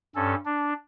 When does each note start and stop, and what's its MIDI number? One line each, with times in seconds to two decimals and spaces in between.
0.16 0.35 43
0.16 0.35 61
0.16 0.35 69
0.45 0.73 62